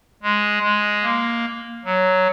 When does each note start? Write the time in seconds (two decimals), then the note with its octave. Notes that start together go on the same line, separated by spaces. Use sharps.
0.23 G#3
0.63 G#3
1.03 A#3
1.85 F#3